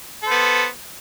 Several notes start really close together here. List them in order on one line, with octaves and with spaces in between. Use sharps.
A4 C5 B3